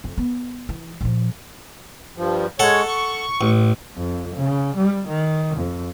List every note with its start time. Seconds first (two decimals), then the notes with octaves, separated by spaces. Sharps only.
0.04 F2
0.18 B3
0.69 E3
1.01 A#2 F3
2.17 G2 F3
2.60 G#3 A4 C#5 F#5
2.87 C#6
3.41 A1
3.97 F2
4.36 C#3
4.77 G3
5.08 D#3
5.57 F2